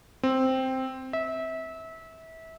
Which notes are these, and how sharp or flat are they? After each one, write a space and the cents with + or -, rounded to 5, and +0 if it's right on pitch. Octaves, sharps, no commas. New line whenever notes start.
C4 +0
E5 -25